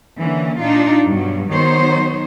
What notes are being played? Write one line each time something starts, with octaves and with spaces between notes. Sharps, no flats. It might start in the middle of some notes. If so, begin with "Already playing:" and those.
D3 E3 A#3 C#4
A#2 D4 D#4 F4
G2 B2 F#3 G3
D#3 F#3 B3 D#4 C5 C#5